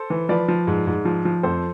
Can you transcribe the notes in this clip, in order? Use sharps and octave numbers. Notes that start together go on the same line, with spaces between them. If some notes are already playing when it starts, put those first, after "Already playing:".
Already playing: A4 C5
E3
F3 B4 D5
F3
G#2
G#2
F3
F3
F2 A4 C5